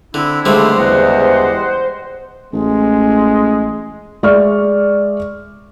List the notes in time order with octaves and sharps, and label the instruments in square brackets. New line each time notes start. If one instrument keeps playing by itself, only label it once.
[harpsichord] D3 [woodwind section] C4 D4 E4
[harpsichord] C#2 D3 G3 [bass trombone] A3 [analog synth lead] C5
[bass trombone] E2 [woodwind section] G4 D#5 F#5
[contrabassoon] A1 [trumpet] G#3
[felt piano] G#3 D5 E5 C#6 F6